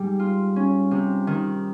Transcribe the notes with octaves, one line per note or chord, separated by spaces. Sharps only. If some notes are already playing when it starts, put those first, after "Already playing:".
Already playing: G#2 G3
F4
C#4
C3
D#3